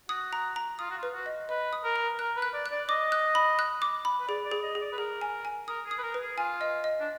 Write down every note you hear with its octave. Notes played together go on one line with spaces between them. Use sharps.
F#4 D#6
A#5
A#5
F4 D#6
F#4
F4
B4
F#4
D#5
B4 D#5
D#6
A#4
A#5
A#4 F#6
B4
F#6
D5
F#6
D5
D#5 D6
F#6
B5
F#6
D6
B5
B4
G#4 D5
D5
G#4
D#5
G#4
D5
B4
G#4 A#4
G#5
G#5
A#4 D#6
G#4
D#6
B4
A#4
B4
G#4
F4 G#5
D#5
D#5
D4